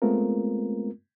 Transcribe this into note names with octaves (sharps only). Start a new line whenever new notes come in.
G#3 A3 B3 C4 F4 A#4